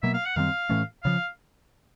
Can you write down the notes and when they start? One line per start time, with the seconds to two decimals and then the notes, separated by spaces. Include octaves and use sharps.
0.02 B2 F#3 A#3 E5
0.14 F5
0.25 F#5
0.36 F#2 D#3 G3 C4 F5
0.69 A2 E3 A3 C#4
1.03 C#3 F3 F5